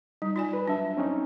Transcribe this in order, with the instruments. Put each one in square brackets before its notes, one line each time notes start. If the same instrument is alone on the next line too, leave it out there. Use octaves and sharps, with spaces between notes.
[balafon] G3 [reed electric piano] D#4
[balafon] F4 D5 G#5
[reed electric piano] B4
[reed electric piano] F#3 E5 [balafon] D4
[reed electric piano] C4 C#4 D#4